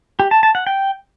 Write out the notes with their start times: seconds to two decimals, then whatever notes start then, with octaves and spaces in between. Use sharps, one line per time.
0.20 G4
0.31 A5
0.43 A5
0.55 F#5
0.67 G5